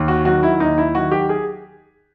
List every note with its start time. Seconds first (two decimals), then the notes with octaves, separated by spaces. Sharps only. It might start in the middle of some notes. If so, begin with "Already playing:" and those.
Already playing: D#2
0.08 F#4
0.25 D#3 F#3 F#4
0.43 E4
0.60 D#2 D#4
0.78 E4
0.95 D#3 F#3 F#4
1.12 G4
1.29 G#4